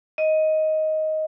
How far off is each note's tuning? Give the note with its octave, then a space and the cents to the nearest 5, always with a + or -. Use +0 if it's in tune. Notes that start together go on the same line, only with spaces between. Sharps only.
D#5 +10